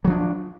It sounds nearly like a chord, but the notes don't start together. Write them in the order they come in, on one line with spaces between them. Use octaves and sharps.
F#3 F3 D4